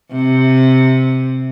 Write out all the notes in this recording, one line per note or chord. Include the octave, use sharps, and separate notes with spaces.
C3